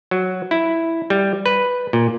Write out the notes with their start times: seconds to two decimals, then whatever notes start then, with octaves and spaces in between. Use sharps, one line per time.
0.11 F#3
0.51 E4
1.10 G3
1.46 B4
1.93 A#2